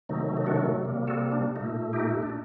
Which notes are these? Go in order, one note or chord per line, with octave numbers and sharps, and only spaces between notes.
C3 D#3 F#3 A3 D#4
D#4
D4 F#4
C3 G3 A#3
F#4 A4
D4
A#2 A3 D#4
D#4 G4
D4